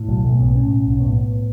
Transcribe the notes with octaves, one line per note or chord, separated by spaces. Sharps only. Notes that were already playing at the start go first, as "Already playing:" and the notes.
Already playing: A2
B1 F#3
B1 A3
A2 B3
A2 C#4
B1
B1
C#4
A2 B3
A2